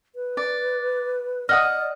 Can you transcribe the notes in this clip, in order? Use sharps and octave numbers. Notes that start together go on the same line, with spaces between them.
B4
D5
D5 D#5 F#5 D#6 F6